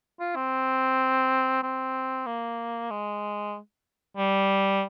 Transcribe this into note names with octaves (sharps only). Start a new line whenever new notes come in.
F4
C4
C4
A#3
G#3
G3